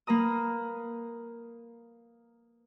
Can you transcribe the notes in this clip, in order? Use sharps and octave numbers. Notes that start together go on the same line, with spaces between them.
A#3 B4 A#5 D#6